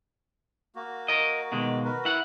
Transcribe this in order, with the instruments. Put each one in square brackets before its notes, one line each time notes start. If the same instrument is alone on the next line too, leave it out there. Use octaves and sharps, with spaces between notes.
[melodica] A#3 F#4
[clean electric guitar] A#4 D#5
B2 D#3 G#3
[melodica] F#4 A#4 B4
[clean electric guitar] E4 F#5